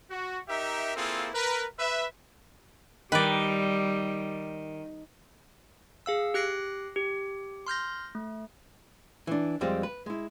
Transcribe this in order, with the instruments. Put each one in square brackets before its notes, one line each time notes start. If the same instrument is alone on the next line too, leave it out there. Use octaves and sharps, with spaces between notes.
[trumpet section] F#4
D#4 G4 A#4 E5
A#3 C4 E4 F4 G#4 A4
A#4 B4
B4 E5
[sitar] D#3 [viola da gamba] G3 [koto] B4 D5
[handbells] G#4 F5 E6
G4 F#6 A#6 C7 D7
G4
C6 F6 G6 A#6
A3
[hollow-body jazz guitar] E3 D4
F2 G3 G#3 C4
B4
G#3 E4